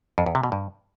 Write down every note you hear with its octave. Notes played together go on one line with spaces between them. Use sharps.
F2
E2
C3
B2
G2